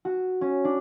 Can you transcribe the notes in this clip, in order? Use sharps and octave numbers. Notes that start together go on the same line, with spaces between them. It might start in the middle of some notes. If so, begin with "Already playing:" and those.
F#4
C#4
D4